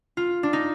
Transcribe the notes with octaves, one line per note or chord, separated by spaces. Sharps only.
F4
D4
D#4